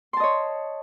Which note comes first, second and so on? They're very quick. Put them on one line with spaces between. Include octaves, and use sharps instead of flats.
C6 A5 D#5 C#5